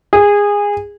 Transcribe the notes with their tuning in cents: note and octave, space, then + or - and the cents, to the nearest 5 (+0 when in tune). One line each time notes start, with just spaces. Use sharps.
G#4 -20